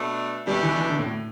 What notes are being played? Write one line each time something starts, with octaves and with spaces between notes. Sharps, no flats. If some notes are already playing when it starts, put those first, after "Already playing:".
Already playing: B2 A3 D4
B2 G3 A3 D4 G4
E3
E3
D3
A2